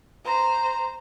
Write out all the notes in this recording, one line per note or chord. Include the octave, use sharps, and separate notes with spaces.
C5 A#5